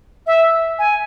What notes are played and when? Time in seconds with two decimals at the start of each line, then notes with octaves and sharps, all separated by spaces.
0.27 E5
0.79 G#5